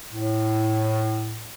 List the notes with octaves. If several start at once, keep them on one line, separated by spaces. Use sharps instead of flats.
A2